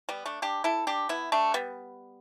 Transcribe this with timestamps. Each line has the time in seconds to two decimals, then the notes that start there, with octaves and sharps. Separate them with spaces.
0.09 G3 B3
0.26 A3 D4
0.42 D4 G4
0.64 E4 A4
0.87 D4 G4
1.09 B3 E4
1.32 A3 D4
1.54 G3 B3